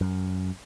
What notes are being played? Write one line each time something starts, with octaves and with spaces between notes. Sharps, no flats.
F#2